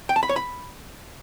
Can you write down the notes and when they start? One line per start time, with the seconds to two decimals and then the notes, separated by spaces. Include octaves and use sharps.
0.09 G5
0.16 A5
0.23 B5
0.29 C#5
0.36 B5